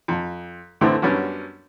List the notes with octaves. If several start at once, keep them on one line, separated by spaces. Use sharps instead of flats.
F2
A2 D3 E3 A3 C4
F#2 G3 B3 C#4 D4